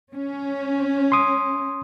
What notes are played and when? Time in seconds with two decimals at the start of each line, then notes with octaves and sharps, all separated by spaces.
0.13 C#4
1.12 C6 D#6